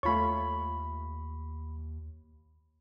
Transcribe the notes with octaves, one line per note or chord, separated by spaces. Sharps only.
D#2 A3 F4 C#5 B5 C#6